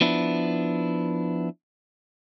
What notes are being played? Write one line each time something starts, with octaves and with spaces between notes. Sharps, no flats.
F3 B3 D4 E4